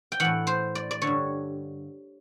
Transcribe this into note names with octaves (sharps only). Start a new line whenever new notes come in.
G5
A2 E3 F#5
C5
D5
D5
D3 C#5
G2